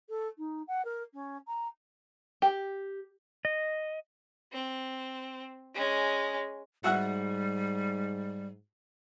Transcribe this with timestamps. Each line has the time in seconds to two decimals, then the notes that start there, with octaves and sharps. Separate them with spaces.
0.09 A4
0.38 D#4
0.67 F#5
0.85 A#4
1.13 C#4
1.47 A#5
2.42 G4
3.45 D#5
4.52 C4
5.74 G#3 C#4
6.84 G#2 G3 F#4 E5 F#5